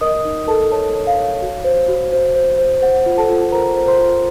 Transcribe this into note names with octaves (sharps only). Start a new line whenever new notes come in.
A#4 D#5 D#6
D#4
A4 A#4 A5
A4 C#5 A5
C#5
F5
C#5
F#4
C5
F#4
C5
C5
C5
C5 F#5
F4
A4 A5
F4
A#4 C5 A#5
C5
C5 C6
F4